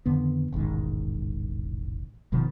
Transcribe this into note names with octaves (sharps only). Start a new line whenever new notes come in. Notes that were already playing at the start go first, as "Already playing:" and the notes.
F2 D3 D#3 B3
E1 A1 G#2 D#3
F#1 B2 D#3 F3